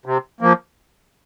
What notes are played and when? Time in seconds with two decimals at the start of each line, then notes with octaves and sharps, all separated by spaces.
0.06 C3
0.41 F3 A#3